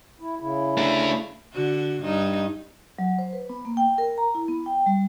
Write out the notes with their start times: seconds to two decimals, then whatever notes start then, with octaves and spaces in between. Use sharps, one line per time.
0.20 E4
0.40 C#3 E4
0.77 A3 D4
1.54 D3 F#4
2.03 G2 D#4
2.99 F#3
3.19 C5
3.33 B4
3.49 B3
3.65 A#3
3.77 G5
3.98 A#4
4.18 A#5
4.35 E4
4.48 B3
4.66 G5
4.86 G3